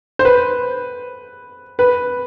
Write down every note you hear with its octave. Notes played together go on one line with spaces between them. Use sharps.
C5
B4
B4